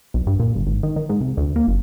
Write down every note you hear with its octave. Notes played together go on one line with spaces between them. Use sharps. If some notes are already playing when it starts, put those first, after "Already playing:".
B1
G2
A#2
G1
G#1
D#3
D#3
G#2
C2
D2
A#3
F#1